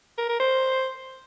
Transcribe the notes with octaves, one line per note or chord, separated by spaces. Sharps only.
A#4
A#4
C5